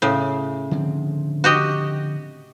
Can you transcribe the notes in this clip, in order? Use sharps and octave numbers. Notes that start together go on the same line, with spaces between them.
A2 C#3
D3 F3 C4
F#4 G4 D#5